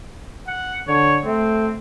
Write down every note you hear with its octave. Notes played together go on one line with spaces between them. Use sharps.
F#5
D3 C#5
A3 C4